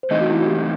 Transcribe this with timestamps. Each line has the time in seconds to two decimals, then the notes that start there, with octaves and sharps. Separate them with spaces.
0.03 C5
0.11 E3 A3 C4 D#4 D#5
0.21 F#4
0.30 E4
0.39 F#4
0.48 G4